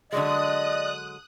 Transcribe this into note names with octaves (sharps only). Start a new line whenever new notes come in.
D3 F#3 G#3 D5 D#5 D#6 F#6